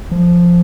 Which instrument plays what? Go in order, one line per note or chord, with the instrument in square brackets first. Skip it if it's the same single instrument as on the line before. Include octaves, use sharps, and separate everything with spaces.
[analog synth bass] F3